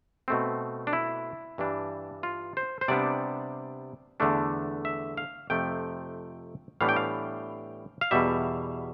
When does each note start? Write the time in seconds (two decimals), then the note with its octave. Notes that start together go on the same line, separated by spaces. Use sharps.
0.28 B2 A3 C4
0.87 D4
0.93 E4
1.58 G2 E3 G3 D4
2.23 F4
2.57 C5
2.81 C5
2.88 C3 G3 B3 D4 D5
4.20 E2 D3 A3 D4
4.85 E5
5.17 F5
5.50 F2 C3 F3 A3 G5
6.81 A2 E3 G3 B3 D4 F5
6.89 G5
6.96 F5
8.01 F5
8.11 E2 B2 G3 E5